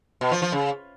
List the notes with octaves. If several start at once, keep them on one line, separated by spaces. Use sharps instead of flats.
B2
F3
F3
C#3